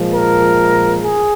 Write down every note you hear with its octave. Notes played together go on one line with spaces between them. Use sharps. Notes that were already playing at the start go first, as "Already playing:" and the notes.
Already playing: A#2 F3 G#3
A#4
G#4